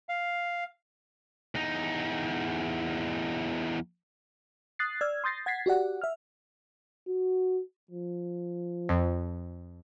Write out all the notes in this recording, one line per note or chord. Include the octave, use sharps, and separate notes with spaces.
F5
E2 D#4
D#6 F#6 A6 C7
D5 E6 F6 G#6
C6 D#6 G6 A6 A#6 C7
F#5 G#6 A6 B6 C7
F#4 G4 D5 F#5
E5 F6
F#4
F3
F2